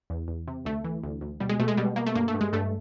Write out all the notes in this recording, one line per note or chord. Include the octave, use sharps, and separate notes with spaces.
E2
E2
C3
D2 A3
E3
D2
D2
B2 G3
G#3
B2 A3
G#3
B2 G3
B2 A#3
A3
G2 A#3
A3
G2
G#3
G2 A3